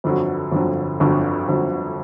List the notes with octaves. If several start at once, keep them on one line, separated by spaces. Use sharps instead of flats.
G1 F2 D3 F#3
G1 F2 D3 F#3
G1 F2 D3 F#3
G1 F2 D3 F#3